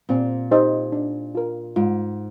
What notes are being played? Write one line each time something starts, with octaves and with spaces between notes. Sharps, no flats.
A#2 C4
D#4 G4 C5 D#5
D4
F4 A#4
G#2 F4